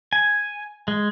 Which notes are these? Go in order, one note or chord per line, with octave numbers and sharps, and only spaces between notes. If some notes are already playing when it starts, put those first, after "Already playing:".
G#5
G#3